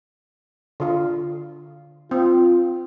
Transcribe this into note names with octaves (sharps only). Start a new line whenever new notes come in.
D3 F4
C4 F4